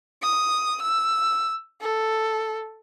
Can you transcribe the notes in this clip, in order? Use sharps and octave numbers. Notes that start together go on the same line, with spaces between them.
D#6
E6
A4